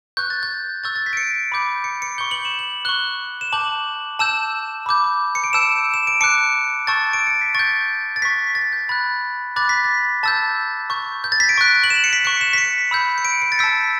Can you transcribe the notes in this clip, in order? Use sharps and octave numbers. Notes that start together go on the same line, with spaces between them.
C#6 F#6 G6
A6
G6
C#6 E6 G6 A6
A6
B6
D7
C#7
B5 D6 G6
C#7
C#7
C#6 G6 G7
F#7
E7
F#7
C#6 F#6 G7
E7
A5 D6 G6 F#7
A5 E6 G6 E7
B5 D6 G6
C#7
D7
A5 E6 G6 E7
E7
D7
A5 D6 F#6 C#7
A5 C#6 E6 G6 A6
D7
C#7
B6
C#6 G6 A6
A6
C#6 F#6 B6
A6
G6
B5 F#6 A6
B5 D6 F#6 A6
B6
A6
A5 E6 G6 A6
C#6 G6
G6
A6
B6
D7
C#6 F#6
F#7
E7
C#7
B6
C#6 F#6 C#7
E7
B6
C#7
B5 E6 G6
C#7
D7
C#7
A6
A5 E6 G6 B6